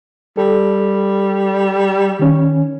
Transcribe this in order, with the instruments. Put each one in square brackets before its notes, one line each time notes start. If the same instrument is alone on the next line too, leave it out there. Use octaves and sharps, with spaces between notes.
[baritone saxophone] G3 [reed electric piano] A4
[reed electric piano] D#3 C#4